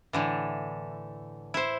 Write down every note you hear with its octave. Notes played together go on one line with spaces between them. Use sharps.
A2 D3 E3
E4 C5